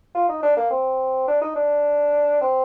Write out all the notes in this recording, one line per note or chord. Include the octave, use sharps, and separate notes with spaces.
F4
D#4
D4
A#3
C4
D4
D#4
D4
C4